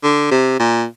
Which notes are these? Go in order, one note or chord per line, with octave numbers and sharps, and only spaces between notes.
D3
C3
A#2